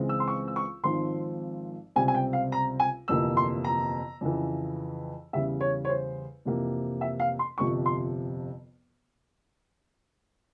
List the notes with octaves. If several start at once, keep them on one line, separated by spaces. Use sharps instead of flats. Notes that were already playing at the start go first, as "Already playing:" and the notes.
Already playing: C#2 C#3 E3 G#3 C4
E6
C6
C#6
E6
C#6
G#1 G#2 F3 C4 C6
C#2 C3 G3 C4 G#5
G#5
G5
F5
A#5
G#5
G1 F2 C3 E3 A#3 E6
C6
A#5
F2 C#3 E3
E2 C#3 G3 E5
C#5
C#5
C5
F2 C3 E3 A#3
E5
F5
C6
G1 F2 C3 F3 C#6
C6